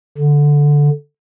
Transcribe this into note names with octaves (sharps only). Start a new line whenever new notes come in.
D3